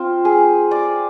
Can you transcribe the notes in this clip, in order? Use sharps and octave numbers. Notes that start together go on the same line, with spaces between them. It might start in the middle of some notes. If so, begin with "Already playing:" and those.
Already playing: C4 F4
G#4
D5